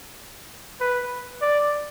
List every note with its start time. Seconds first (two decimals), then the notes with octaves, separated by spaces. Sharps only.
0.81 B4
1.42 D5